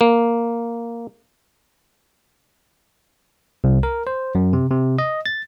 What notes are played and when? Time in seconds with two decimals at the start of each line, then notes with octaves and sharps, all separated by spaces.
0.01 A#3
3.64 C2
3.83 A#4
4.07 C5
4.35 F#2
4.53 C3
4.71 C3
4.99 D#5
5.26 A6